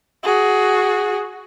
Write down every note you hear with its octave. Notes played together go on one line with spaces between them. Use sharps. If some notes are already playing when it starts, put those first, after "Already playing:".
F#4 G#4